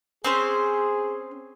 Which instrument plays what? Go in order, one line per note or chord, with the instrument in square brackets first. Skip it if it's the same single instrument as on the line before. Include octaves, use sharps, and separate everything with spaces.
[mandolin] C4 C#4 C5 [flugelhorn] G#4